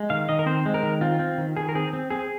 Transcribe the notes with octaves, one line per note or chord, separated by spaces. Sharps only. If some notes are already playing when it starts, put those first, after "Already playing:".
Already playing: G#3
D#3 F5
D#3 D#5
A#4
C4 C5
G#3
A#4
D#3
C4 F4
C4
D#3
D#3 G#4
A#4
C4 G#4
C4
C4 G#4